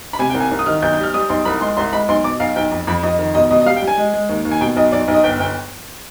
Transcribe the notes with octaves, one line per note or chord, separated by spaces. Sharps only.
B5
C3 G#5
G5
C2
G#5
C2
D#6
D#3 F6
B1 G6
G6
G3
F6
G3 D#6
B1 C6
C2 B5
G#3 C6
C2 C6
G#3 B5
B1 C6
B2 D6
B1 F5
B1 G5
F2
F2 B5
F2 D#5
D#3
B2 D#5
B2 D#5
D#5
G3 F5
G5
G3
G#5
G#3
G#3
D#2
D#2
G#5
B2 G5
B1 D#5
B1 D5
B1
D#5
G1 G5
G1 G5